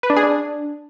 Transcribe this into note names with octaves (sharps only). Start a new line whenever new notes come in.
B4
D4
G#4
D4